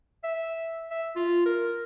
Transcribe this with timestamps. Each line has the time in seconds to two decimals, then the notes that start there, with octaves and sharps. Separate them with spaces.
0.24 E5
0.91 E5
1.16 F4
1.46 A#4